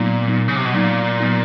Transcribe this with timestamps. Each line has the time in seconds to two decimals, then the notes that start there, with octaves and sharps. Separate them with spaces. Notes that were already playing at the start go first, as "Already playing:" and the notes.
Already playing: A#2 F#3 B3 D#4
0.27 F#3 B3 D#4
0.48 C#3
0.56 C3
0.65 B2
0.74 A#2 F#3 B3 D#4
1.20 F#3 B3 D#4